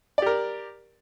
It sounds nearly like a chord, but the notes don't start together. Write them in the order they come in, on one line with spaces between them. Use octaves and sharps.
D5 G4 A#4